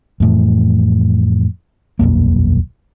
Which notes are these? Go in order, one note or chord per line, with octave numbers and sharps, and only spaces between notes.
F2 A2 E3
D#1 B1 F2 A#3